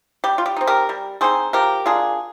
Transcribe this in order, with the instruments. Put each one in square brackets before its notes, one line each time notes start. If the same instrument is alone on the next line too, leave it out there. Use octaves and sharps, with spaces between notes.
[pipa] G3 G4
F4
G4
C4 D#4
G4 A#4
G3
C4 D#4 G#4 C5
F3 G4 A#4
A#3 D4 F4 G#4